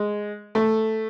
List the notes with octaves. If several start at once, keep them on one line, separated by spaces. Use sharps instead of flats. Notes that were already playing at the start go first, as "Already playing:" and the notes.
Already playing: G#3
A3